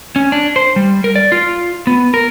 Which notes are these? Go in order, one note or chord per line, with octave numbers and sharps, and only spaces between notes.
C#4
D4
C5
G3
A#4
D5
F4
B3
A#4